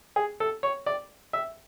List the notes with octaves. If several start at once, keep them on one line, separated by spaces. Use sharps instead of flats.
G#4
A4
C#5
D5
E5